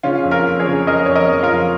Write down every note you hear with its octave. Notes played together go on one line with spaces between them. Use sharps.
C#3 C#4 F4
F2
F4 A#4
F2
G#4 C#5
C#3
F2 A#4 D#5
F2 C#5
A#4 D#5
F2
F4 A#4
F2